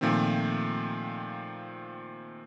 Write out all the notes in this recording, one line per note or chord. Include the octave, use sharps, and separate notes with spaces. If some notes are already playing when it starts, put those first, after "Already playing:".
A#2 D#3 F3 A3 C4